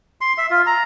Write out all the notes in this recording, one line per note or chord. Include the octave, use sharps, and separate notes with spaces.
C6
E5
F4
A#5